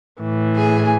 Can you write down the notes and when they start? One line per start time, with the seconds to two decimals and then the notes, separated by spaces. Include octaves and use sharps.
0.21 A2 E3
0.57 G#4 G#5